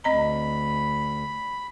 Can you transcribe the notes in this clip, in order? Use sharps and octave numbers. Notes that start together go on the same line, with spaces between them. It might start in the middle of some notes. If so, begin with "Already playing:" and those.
D2 C4 D#5 A#5 B5